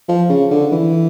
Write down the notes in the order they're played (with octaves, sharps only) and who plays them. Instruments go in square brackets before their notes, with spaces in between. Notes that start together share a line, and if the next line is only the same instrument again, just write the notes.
[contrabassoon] F3
C#3
D3
E3